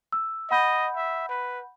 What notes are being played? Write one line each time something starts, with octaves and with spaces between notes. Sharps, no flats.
E6
D#5 F#5 B5 G6
E5
B4